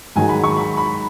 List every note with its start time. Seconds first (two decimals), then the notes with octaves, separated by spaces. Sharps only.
0.16 G#2 D#3 F#3 G#5
0.29 B5
0.44 C#6
0.57 B5
0.77 B5